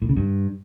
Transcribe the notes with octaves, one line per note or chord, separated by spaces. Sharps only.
A2
C#3
G2